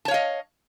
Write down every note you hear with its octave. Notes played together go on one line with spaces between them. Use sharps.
C#5 D#5 F5 A5